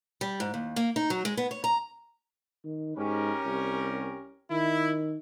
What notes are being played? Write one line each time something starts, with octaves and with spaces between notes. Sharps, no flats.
G3
G#2
D#2
A#3
D#4
F#3
G#3
B3
C#5
A#5
D#3
G#2 C#4 G4 A#4
C2
D#3 E4